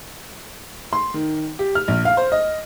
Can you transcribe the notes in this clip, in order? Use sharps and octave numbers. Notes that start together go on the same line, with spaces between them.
C6
D#3
G4
F6
A#1
F5
C5
D#5